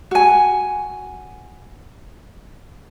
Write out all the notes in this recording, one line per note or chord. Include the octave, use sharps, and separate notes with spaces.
F#4 G#5